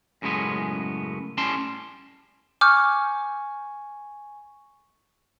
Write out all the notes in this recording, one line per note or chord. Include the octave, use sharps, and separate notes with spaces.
F#2 A2 C#3 G#3 B3
A2 G3 C#4 A5 C6
G#5 C#6 D6 F6 G6